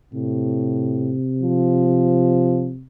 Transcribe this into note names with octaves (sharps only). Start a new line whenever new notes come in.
A2 C3
F3